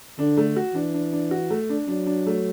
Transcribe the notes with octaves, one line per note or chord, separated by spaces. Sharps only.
D3 D4
A3
F#4
E3 D4
D4
D4
F#4
A3
D4
F#3 D4
D4
A3